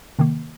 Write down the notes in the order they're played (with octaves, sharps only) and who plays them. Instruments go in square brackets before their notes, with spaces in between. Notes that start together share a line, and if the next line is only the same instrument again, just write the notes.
[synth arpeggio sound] C3 D#3 A#3